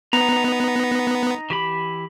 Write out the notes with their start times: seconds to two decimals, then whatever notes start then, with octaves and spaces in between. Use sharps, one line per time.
0.13 B3 D#4 A#5
1.50 E3 G4 B5